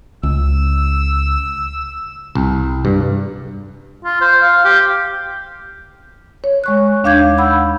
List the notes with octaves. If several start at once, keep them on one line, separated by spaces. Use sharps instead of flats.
C#2 E6
C2
G2
F4
C5
F5
G4
C#5
G#3 C#6 F#6
D#2 D4 F5 D6 G6 G#6
F#5 B5 E6 G6